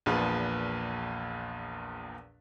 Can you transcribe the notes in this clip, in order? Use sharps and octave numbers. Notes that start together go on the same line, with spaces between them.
A#1 E2 A#2 F3 B4